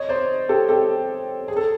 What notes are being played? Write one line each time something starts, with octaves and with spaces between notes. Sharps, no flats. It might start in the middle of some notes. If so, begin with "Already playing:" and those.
Already playing: C#5 D#5
C5 D5
G4 A4
G4 A4
G#4
A4